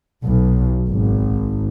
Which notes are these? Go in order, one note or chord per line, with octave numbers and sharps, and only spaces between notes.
B1
G#1